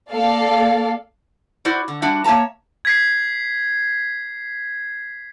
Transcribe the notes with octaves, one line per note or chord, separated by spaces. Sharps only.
A#3 A4 D5 F5
E4 F#4 C5 D5
D3
G3 D4 F#4 E5
A#3 C#5 E5 A5 A#5
G#6 B6 C7